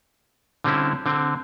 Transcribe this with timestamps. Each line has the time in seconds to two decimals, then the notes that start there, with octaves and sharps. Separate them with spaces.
0.64 D3 G3 C4 C#4 E4
1.06 D3 C4